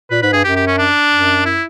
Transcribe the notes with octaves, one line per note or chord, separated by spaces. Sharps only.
A#2 B4
G#2 B4
G2 G#4
F#2 G4
G4
C#4
D4
F#2
E4